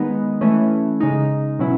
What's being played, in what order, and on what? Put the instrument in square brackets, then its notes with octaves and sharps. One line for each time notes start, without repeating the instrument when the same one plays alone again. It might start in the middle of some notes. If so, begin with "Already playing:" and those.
Already playing: [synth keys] D#3 G#3 B3 D#4
E3 A3 C#4
C#3 G#3 D#4
B2 F#3 C#4 E4